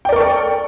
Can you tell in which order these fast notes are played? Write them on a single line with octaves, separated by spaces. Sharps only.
G5 D5 A#4 C#6 A4